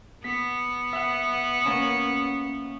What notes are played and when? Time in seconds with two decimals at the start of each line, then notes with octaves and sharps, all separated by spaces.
0.24 B3 B6
0.93 E5 F#5
1.63 A#3 C#4 E7